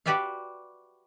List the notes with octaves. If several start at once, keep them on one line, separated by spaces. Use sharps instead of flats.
F#4 G4 B4 D5 E5 F5